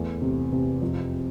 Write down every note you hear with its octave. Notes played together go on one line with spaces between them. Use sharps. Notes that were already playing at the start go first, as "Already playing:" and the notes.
Already playing: E2 A3
C3
C3
F2